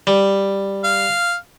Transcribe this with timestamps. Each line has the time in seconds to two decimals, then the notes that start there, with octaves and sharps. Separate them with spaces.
0.07 G3
0.84 F5